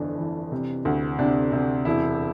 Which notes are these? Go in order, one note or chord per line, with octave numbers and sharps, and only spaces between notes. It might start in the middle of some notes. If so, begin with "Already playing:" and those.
Already playing: G1 F2 E3 D4
E3
C3
D2
C3 D4
C3
E1 E4